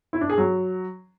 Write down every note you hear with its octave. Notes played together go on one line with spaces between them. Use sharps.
E4
D4
G#4
F#3